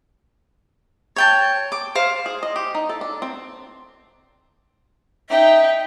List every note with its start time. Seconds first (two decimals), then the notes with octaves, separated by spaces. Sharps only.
1.16 C#5 G5 A5
1.72 D6
1.95 C5 F5
2.26 G#4
2.43 D#5
2.56 G4
2.75 D#4
2.89 A4
3.01 D4
3.22 C4
5.30 D#4 E5 G5